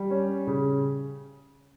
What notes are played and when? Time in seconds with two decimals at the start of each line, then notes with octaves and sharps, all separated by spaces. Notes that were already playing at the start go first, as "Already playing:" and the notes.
Already playing: G3
0.10 C#4
0.47 C#3